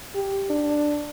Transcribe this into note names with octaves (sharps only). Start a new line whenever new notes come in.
G4
D4